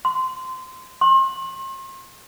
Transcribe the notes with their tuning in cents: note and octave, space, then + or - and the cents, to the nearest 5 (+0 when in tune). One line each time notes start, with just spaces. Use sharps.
C6 -20
C6 +40